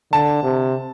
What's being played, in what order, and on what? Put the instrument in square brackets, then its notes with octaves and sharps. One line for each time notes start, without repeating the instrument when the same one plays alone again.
[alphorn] D3 [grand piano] A5
[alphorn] C3